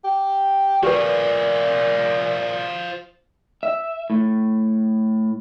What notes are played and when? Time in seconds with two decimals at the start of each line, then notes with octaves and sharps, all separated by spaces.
0.04 G4
0.83 A#2 F3 G4 G#4 B4
3.63 E5
4.10 A2